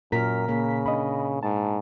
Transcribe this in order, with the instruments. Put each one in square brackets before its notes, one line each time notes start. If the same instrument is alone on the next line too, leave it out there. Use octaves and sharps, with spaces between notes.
[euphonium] F#2 [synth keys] A#2 A#5 B6 [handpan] A#4
[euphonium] C#3 [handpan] A#3 A#4
[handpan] A#2 D4 [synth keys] D#5 B5
[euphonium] G#2 [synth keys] A5